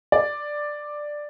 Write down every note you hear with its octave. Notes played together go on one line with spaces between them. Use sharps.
D5